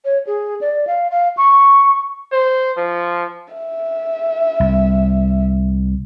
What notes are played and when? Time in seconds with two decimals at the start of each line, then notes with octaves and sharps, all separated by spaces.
0.05 C#5
0.27 G#4
0.61 D5
0.87 F5
1.11 F5
1.37 C#6
2.32 C5
2.77 F3
3.54 E5
4.60 C2